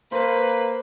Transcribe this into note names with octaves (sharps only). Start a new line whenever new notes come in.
A#3 B4 C5